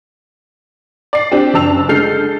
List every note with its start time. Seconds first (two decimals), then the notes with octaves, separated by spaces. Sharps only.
1.13 D5 C7
1.32 C4 D4 G4
1.54 F#1 D4 A5 E6 F7
1.88 D3 G#3 A4 F6 G6 C7